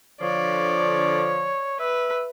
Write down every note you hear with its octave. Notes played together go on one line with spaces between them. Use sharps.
D3 F3 C#5 D5
B4 E5